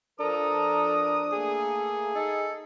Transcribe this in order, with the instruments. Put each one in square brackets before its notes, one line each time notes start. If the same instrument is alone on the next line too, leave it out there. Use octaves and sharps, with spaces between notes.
[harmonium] F3 A#4 A#5 [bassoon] D4 [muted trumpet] A4 [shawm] D#6
[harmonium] A3 A#3 A4 [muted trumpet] G#4
[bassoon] D#4 [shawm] A4